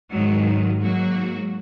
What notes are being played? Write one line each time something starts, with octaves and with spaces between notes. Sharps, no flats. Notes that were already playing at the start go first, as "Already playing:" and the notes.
G#2 D#3 F#3
G#2 F#3 A#3 F#4